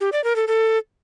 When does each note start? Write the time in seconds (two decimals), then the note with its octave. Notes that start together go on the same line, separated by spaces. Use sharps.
0.01 G4
0.12 D5
0.24 A#4
0.36 A4
0.48 A4